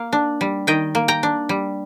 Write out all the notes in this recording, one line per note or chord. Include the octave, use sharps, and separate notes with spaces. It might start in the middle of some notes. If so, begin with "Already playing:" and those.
Already playing: A#3 F5
D4
G3
D#3 D#5 G5
A#3
G5 A#5
D4
G3